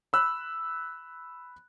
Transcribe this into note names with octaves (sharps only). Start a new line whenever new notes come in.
B5 E6 F#6